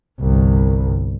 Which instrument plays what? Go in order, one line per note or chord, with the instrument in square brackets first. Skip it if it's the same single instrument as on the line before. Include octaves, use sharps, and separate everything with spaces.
[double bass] G1 C2